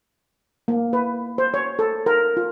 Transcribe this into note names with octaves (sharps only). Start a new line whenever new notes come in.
A#3
B4
C5
C#5
A4
A#4
F4